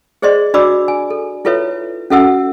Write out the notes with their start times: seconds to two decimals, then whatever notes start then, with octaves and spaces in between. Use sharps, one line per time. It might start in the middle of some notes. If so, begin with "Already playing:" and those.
0.22 G#4 C5 D5 D#5 C6
0.54 D4 F#4 D5 B5 D6 E6
0.88 G#5
1.10 A4
1.45 E4 F4 A4 B4 C#5 E5
2.10 C#4 F#4 A4 E5 F#5 E6